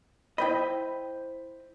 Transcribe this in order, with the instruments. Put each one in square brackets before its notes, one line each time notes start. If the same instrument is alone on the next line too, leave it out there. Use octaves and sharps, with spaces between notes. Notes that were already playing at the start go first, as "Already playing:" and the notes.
[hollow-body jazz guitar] E4 C5 D#5 [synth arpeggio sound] G5 B5